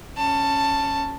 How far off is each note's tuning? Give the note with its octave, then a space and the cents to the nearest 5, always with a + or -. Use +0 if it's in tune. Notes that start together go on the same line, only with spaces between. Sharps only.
C#4 +0 A5 +10